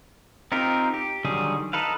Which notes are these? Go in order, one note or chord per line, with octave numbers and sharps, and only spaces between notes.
C4 D#4 F4 G4 A#4
G4
D3 D#3 F#3 G3 G#4
D#4 A4 B4 F5